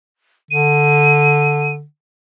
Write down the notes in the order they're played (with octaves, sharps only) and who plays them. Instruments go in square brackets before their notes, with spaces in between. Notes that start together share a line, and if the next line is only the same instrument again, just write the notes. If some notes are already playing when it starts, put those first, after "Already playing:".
[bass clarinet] D3 [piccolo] D#7